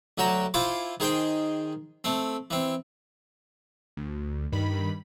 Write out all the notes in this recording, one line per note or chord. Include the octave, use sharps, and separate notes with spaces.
D2 F#3 F#4 G5 A#5
E4 F4 C5 G#5 D6
D#3 G#4 C5 G5
A3 C4
E3 C4
D2
G2 D#3 B5